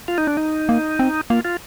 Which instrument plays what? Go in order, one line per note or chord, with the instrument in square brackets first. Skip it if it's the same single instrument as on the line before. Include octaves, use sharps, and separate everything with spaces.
[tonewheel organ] F4
D#4
D4
D#4
[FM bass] A#3
C4
[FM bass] A#3 [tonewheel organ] F4
[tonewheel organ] F4